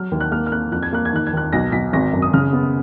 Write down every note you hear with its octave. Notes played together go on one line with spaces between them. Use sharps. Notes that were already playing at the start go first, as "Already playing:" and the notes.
Already playing: F#3 F6
D#2
F#6
A#3 F6
F6
A#3 F#6
F2 F#6
G#6
A#3 F#6
G#6
D#3 F#6
G#6
D#2 F#6
B1 A#6
B1 B6
G#1 A#6
F#2
D#6
C#3 F6
B3